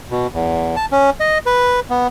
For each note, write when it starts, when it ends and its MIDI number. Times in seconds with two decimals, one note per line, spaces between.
0.11 0.27 47
0.34 0.76 40
0.76 0.86 81
0.92 1.10 61
1.20 1.38 75
1.46 1.80 71
1.90 2.08 59